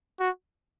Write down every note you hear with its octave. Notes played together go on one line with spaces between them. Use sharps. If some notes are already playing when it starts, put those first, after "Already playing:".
F#4